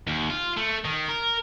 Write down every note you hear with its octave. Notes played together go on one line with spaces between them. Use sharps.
D#2
F4
A3
D#3
A#4